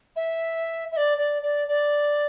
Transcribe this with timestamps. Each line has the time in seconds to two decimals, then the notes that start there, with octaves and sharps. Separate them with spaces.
0.16 E5
0.92 E5
0.97 D5
1.18 D5
1.42 D5
1.68 D5